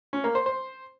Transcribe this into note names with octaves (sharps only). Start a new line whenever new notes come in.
C#4
A#3
C5
C5